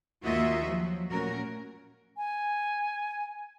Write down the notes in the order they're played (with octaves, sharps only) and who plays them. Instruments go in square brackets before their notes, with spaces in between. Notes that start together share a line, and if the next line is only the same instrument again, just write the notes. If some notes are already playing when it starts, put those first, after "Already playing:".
[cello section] D#2 A#3 F4 F#4 D#5 E5
F3 F#3
A#2 A3 C#4 F#4 A#4
[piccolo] G#5